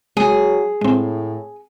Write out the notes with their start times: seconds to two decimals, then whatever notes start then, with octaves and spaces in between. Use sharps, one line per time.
0.17 F#3 G#3 G#4
0.81 A2 G#3 C4